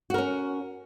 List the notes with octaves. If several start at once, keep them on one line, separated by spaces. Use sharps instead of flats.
C#4 F#4 A#4